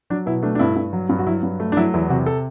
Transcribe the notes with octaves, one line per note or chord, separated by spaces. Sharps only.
F#3 D4
B2 E4
A3 D4
D4
G2 E4
G2
F#3
G2
F#4
F#3 E4
G2
A3
D4
F#3 E4
E2 E4
C3 F#4
A4